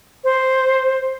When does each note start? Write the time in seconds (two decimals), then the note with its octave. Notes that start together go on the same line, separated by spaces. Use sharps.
0.24 C5